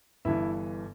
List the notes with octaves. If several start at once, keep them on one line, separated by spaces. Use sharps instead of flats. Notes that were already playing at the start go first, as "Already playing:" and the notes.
G1 G2 E3 E4 E5